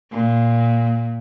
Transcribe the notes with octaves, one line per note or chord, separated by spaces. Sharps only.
A#2